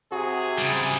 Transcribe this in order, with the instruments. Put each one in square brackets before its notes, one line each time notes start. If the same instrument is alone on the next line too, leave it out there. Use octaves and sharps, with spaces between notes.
[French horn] C3 [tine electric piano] F#4 [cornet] G#4
[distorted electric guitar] C#3 G3